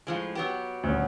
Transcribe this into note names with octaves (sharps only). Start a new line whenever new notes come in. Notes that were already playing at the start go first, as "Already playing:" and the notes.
A2 F3 G#3
F#3 B3 G4
D#1 D2